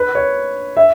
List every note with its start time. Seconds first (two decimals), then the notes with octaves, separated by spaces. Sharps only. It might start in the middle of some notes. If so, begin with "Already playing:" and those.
Already playing: B4
0.15 C#5
0.77 E5